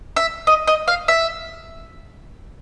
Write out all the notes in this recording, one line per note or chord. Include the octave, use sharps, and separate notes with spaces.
E5
D#5
D#5
F5
E5